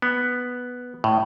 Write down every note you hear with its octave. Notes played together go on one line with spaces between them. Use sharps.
B3
A2